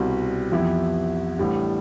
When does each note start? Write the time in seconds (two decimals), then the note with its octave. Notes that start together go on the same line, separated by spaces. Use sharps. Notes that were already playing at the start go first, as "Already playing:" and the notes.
Already playing: C2 B2 G3 C4
0.52 F2 E3 B3 E4 G4
1.38 A1 A2 G3 D4